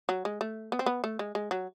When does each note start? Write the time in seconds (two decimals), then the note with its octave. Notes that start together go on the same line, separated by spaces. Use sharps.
0.09 F#3
0.25 G#3
0.41 A3
0.72 B3
0.79 C4
0.86 B3
1.04 A3
1.19 G#3
1.35 G#3
1.51 F#3